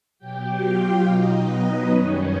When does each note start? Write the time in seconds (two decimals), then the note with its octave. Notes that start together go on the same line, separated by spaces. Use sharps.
0.19 B2 F#3 G4 G5
0.60 F4 F5
1.03 B2 F#3 D#4 D#5
1.44 B3 B4
1.86 F#2 D#3 G3 C#4 C#5